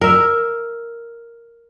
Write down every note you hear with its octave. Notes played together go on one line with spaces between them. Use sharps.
A#4 E5